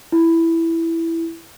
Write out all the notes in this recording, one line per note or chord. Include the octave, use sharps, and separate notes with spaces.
E4